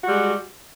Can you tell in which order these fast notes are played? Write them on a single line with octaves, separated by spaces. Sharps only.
F#4 G3 G#3